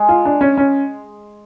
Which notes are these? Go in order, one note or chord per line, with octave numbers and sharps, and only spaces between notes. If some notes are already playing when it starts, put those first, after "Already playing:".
Already playing: G#3
F4
D4
C#4
C#4